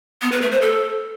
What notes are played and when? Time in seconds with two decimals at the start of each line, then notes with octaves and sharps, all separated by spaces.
0.22 B3
0.32 B4
0.42 A3
0.52 C5
0.62 A4